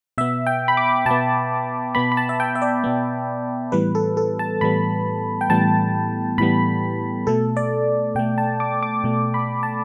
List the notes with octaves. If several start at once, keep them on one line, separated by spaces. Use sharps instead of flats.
B2 B3 E5
G5
B5
D6
B2 B3 A5
B2 B3 B5
B5
A5
E5
G5
E5
D5
B2 B3
A2 E3 G3 B3 B4
A4
A4
A5
A2 E3 G3 B3 B5
G5
A2 E3 G3 B3 A5
A2 E3 G3 B3 B5
B2 A3 A4
D5
B2 A3 G5
A5
D6
D6
B2 A3
B5
A5